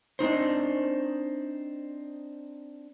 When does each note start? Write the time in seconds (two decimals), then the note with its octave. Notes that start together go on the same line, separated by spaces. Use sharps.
0.19 C4 D4 D#4 C5